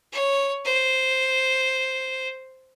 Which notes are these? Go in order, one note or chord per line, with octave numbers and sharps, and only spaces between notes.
C#5
C5